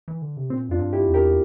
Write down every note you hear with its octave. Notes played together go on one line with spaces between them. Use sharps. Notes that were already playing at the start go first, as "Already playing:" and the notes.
E3
D3
C3
A#2 C4
F2 D4 F4
G2
E4 G4
E2
G4 A#4